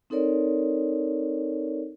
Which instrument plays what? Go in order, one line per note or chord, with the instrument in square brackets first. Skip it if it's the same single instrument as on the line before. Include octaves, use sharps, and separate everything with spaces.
[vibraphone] C4 D#4 A4 A#4 C#5 D5